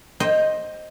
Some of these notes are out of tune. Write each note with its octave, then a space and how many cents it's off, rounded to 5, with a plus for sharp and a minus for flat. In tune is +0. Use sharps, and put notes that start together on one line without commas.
C5 +15 D#5 +0 G5 +0